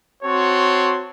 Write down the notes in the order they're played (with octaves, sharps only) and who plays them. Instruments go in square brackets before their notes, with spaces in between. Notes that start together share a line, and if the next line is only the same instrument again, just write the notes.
[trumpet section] C4 F#4 C#5 A5 C6